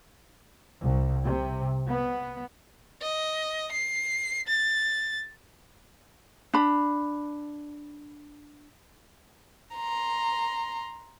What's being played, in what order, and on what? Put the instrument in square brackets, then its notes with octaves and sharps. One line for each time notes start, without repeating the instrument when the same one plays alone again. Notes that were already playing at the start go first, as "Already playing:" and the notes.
[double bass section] C2
C3
B3
[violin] D#5
C7
A6
[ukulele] D4 B5
[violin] A#5 C6